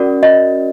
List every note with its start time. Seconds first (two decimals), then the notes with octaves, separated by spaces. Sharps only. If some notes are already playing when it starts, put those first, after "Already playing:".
Already playing: C#4 F#4 A#4 D5
0.23 D#5